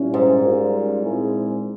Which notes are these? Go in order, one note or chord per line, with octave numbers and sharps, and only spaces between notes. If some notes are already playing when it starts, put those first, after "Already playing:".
Already playing: A#2 G3 C#4 E4
G#2
G3 C#4 F4 A#4
A#2 G#3 C4 E4 G#4